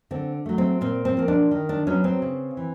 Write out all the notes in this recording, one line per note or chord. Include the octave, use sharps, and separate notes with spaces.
D3 C4
F#3 A3
C4
A#2 C4
C4
F3 A#3
D4
D#3
D4
F#3 B3 C#4
C4
C#3
E3